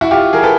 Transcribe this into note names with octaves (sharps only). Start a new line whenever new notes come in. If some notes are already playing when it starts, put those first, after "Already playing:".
E4 F#4
F4 G4
G#4 A#4
A4 B4